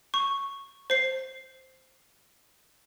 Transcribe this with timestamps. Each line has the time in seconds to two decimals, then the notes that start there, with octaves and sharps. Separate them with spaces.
0.14 C#6
0.90 C5 C7